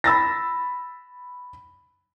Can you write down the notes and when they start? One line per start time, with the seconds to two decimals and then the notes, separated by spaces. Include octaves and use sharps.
0.04 B5 E6 A6 A#6